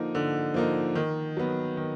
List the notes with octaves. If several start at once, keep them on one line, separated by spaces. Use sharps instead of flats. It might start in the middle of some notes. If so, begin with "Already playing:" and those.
Already playing: D3 F3 A#3 D#4
D3
F3 A#3 D#4
D#3
F#3 B3
D#3